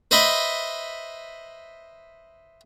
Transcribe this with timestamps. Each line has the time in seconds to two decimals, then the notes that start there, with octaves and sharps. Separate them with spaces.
0.11 B4 C5 D#5 E5 B5